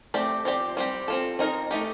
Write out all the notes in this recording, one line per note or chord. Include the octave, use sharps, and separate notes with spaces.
A3 C4 G4 D5
F3 C4 G4 D5
G3 C4 G4
C4 F4 A4
C4 D#4 A#4 D#5
A3 D#4 G4